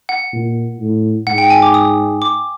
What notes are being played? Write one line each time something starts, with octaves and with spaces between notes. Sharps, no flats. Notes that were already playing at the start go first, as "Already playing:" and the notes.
F#5
A#2
A2
G#2 F#5
G5
G#5
D6
D#6
D6